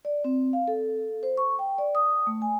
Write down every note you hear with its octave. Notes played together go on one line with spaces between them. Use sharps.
D5
C4
F5
A4
C5
C#6
G5
D5
D#6
A3
G#5